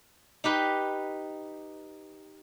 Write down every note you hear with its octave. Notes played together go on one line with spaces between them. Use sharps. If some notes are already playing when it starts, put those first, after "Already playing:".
D#4 G4 B4